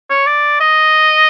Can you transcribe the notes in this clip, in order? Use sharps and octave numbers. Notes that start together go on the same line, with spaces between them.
C#5
D5
D#5